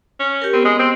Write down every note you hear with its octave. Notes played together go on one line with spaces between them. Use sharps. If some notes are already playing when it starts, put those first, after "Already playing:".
C#4
G4 A#4
B3 C4
G#3
C4